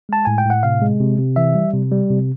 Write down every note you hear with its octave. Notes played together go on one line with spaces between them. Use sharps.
G#3 A5
A2 G#5
G5
A2 F#5
C3 F5
G#3
C3
C3
E3 E5
G3
C3
G3
C3